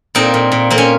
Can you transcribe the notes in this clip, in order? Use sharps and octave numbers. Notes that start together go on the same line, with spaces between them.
A#2 C4 D#4
A#2
A#2
A#3 C4
C#4